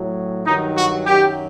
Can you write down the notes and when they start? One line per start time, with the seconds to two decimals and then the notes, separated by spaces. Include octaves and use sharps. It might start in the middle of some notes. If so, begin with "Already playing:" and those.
Already playing: A2 F#3
0.45 G2 D#3 F#3 D#4
0.77 F#4
1.06 F#2 D#3 F#3 G4